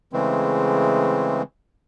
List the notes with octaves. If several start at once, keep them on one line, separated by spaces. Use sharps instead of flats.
C#3 E3 G#3 A3 C4